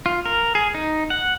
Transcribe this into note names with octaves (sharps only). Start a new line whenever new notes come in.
F4
A#4
G#4
D#4
F#5